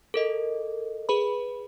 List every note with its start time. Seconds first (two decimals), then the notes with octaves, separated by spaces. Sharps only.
0.14 A4 A#4 D#5
1.09 G#4 B4 B5